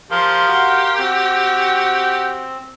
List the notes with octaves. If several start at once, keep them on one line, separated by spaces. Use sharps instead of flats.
F3 G4 A#4 F5 C6
F#4
C4 F#4